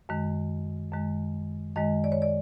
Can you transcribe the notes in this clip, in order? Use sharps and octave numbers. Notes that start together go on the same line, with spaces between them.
F#2 D#3 G#3
F#2 D#3 G#3
F#2 D#3 G#3 D#5
D5
C#5
D5